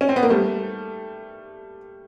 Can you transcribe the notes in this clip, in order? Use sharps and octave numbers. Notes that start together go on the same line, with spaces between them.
C#4
C4
B3
A#3
G3 A3